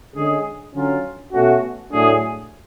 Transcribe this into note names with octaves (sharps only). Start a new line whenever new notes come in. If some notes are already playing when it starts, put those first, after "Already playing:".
D3 G#3 C#4 G#4
D3 F#3 C#4 F4
B2 A3 C#4 F#4
A2 F#3 A3 D4 G#4